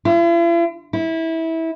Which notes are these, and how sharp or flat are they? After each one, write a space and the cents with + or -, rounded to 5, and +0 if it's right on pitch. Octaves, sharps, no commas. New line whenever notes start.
E4 +45
E4 -20